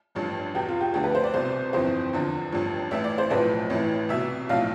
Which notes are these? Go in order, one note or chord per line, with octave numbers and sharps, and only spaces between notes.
A1 G2 F3
E2 B2 G4
F4
G4
D2 D3 F3 G4
B4
C5
D5
C2 B2 C5
G1 F2 E3 C5
E2 D3 F3
A1 G2 F3
A1 A2 E3 E5
D5
C5
B1 A2 F3 B4
A1 A2 E3
C2 B2 E5
B1 A2 F3 F5